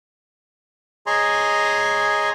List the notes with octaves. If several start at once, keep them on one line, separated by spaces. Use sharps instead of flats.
G#4 C#5 D#5 G#5 A#5 C6